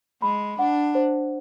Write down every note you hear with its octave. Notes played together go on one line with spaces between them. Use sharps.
G#3 B5
D4 F#5
C5